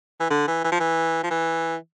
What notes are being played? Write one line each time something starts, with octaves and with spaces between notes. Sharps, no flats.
E3
D3
E3
E3
F3
E3
F3
E3